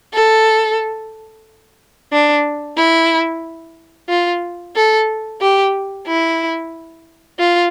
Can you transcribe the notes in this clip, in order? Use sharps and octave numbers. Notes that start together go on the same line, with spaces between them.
A4
D4
E4
F4
A4
G4
E4
F4